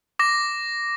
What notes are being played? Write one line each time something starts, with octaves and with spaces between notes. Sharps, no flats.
D6 A#6